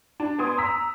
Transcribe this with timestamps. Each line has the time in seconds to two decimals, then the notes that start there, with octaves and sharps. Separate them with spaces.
0.20 D4
0.39 B3 G#5 C6 D#6 D7
0.58 A#5 E6 B6